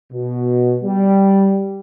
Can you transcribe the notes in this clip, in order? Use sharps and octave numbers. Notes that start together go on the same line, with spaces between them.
B2
G3